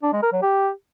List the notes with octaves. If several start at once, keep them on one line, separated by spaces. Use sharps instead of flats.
D4
G#3
A#4
F#3
G4